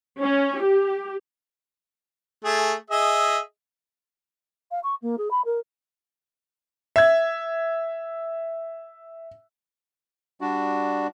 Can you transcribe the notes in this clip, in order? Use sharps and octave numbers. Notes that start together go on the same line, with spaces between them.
C#4
G4
A3 G#4
G#4 D#5 E5
F5
C#6
A#3
G#4
B5
A#4
E5 G#6
G3 D4 F#4